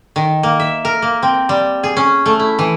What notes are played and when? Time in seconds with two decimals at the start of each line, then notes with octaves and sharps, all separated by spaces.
0.16 D#3
0.43 A#3
0.60 E5
0.85 A#4
1.02 A#3
1.23 C4
1.49 G3
1.83 G#4
1.97 C#4
2.26 A3
2.39 E4
2.59 E3